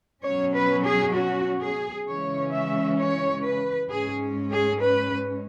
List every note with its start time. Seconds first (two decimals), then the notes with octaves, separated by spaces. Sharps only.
0.24 B2 F#3 C#4 C#5
0.55 B4
0.85 G#4
1.16 F#4
1.62 G#4
2.07 C#3 E3 G#3 C#4 C#5
2.53 E5
2.98 C#5
3.44 B4
3.90 G#2 G#3 C#4 G#4
4.51 G#4
4.81 B4